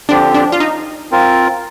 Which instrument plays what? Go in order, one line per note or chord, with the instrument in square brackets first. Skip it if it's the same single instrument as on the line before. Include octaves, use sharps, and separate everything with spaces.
[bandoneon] D3 F3 C4 G4 [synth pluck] D4
[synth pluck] D4
F4
D#4
[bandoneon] C4 F4 A#4